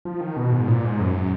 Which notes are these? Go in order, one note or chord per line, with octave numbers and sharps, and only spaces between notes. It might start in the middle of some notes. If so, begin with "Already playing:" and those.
F3
D#3
B2
G#2
A#2
G#2
F#2